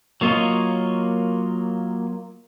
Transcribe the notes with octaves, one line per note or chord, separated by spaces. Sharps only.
F#3 A#3 F4 C#5 D#5